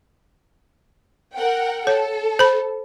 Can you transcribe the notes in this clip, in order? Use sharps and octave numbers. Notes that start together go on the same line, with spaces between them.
A#4 F#5 G5
A4 C#5
C5 B5